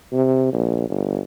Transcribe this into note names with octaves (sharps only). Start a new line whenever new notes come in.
C3
A#1
G1